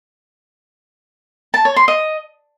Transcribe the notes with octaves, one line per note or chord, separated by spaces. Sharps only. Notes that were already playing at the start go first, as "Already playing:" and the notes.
A5
C#5
C6
D#5